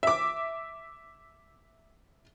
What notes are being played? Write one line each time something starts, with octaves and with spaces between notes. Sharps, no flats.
E5 D6